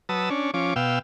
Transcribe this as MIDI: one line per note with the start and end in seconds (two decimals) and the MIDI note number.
0.09 0.30 54
0.09 0.30 71
0.09 0.30 81
0.09 0.30 87
0.09 0.30 88
0.30 0.51 61
0.30 0.51 62
0.54 0.74 53
0.54 0.74 61
0.54 0.74 86
0.76 0.99 47
0.76 0.99 77
0.76 0.99 79
0.76 0.99 88